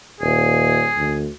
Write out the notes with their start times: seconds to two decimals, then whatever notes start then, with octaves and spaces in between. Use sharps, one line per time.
0.21 D#1 G#4
0.97 D2